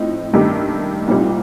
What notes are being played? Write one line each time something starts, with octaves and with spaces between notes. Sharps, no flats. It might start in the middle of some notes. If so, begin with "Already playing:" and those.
Already playing: A2 F3 C4 D#4
G2 D#3 A3 D#4 G4
C2 A#2 G3 C4 D#4